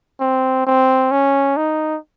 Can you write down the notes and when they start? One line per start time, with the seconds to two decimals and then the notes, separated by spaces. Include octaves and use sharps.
0.20 C4
0.67 C4
1.11 C#4
1.57 D#4